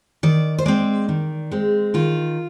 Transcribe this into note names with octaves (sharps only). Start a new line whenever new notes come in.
D#3 D5
C5
G#3 C4 D5
D#3
G#3 C4
D#3 F4